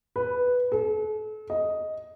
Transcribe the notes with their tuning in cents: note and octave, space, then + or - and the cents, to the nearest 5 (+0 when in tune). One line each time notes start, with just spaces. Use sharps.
B4 +0
A4 -40
D#5 +5